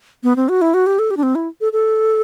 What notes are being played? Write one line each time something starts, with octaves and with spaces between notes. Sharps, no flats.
B3
C4
F#4
E4
F#4
G4
A4
G4
D4
C4
E4
A4
A4